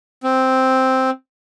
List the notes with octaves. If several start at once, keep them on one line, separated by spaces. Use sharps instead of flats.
C4